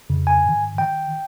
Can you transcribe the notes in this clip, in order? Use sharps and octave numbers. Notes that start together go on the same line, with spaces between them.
F2 C#3
G#5
G#2 D#3
D#3 G5